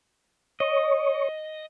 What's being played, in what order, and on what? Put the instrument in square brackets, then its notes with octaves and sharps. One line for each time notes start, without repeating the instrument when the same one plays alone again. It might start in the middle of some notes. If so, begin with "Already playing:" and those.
[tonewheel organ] C#5 [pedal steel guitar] D#5